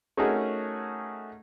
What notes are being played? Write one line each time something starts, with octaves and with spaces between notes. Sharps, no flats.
A3 C#4 D#4 F#4 G#4 A#4